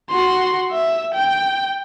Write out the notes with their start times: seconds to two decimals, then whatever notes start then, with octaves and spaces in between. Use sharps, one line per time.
0.10 F#4 C6
0.71 E5
1.14 G5